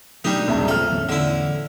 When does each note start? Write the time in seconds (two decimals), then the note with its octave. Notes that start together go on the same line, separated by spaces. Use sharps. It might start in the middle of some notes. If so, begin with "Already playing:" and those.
0.24 B2 F#3 G3 A3 D4 D#4
0.48 E1 C2 F#2 C#4 E5 A#5
0.68 D1 F3 A4 E5 F6
0.90 D1 E2 C#4
1.09 D3 E4